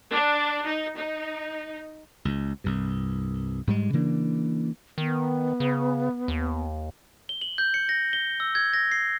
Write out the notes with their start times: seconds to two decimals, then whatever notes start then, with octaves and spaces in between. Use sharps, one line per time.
0.12 D4
0.66 D#4
0.99 D#4
2.25 C#2
2.64 C2 G2
3.67 G#2 G3 G#3
3.93 C#3 E3 A#3 D4
4.98 D#3 B3
5.60 C#3
6.28 D#2
7.29 G7
7.41 F#7
7.58 G6
7.74 C#7
7.89 A#6
8.13 G7
8.40 E6
8.55 G#6
8.73 A#6
8.92 C7